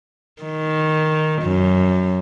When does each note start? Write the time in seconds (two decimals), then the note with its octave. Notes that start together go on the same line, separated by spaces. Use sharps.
0.42 D#3
1.42 F#2